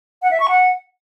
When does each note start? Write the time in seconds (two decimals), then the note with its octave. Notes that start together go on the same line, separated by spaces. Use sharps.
0.22 F#5
0.31 E5
0.40 C#6
0.49 F#5